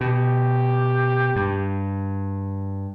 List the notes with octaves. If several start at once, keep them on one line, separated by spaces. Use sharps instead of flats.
B2 G4
G2